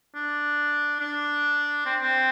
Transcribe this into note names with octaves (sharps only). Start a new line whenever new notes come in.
D4
D4
C4
C4